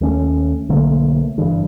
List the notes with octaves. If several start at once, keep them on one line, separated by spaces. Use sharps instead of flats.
D#2 A3 C#4
B1 D3 A3 A#3
F#1 G2 E3